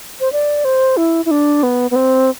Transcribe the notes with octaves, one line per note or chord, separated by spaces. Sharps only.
C5
D5
C5
E4
E4
D4
B3
B3
C4